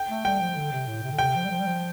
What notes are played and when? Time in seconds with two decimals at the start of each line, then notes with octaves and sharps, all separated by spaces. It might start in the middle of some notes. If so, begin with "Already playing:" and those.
Already playing: G5
0.09 A3
0.25 G3 G5
0.41 F3
0.56 D3
0.72 C3
0.87 A2
1.03 C3
1.12 D3
1.19 C3 G5
1.35 F3
1.44 G3
1.50 F3
1.59 G3
1.67 F3